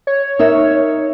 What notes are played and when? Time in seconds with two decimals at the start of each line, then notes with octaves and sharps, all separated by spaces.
0.07 C#5
0.39 D#4 A#4 E5